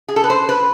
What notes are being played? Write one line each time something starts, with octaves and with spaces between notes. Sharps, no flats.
G#4
A4
B4
C5
B4